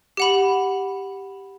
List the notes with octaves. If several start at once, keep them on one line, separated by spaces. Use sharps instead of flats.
G4 F#5 B5